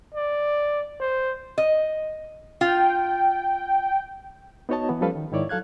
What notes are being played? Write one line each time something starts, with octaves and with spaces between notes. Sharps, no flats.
D5
C5
D#5
F4 G5
B3 D#4 F#4 C#5 D#5 A5
E3 B3
F3 G3 C#4 A4 B4 F5
D#3
G#2 D#3 E4 C#5 D5
F#3 A4 F5 F#6 G#6